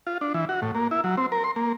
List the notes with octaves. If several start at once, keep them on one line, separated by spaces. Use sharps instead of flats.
F4
D4
E3
F#4
A2
A#3
E4
F#3
C4
A#4
C6
A#3